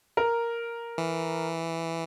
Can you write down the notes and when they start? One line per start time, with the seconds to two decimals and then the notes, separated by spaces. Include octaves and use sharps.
0.17 A#4
0.98 E3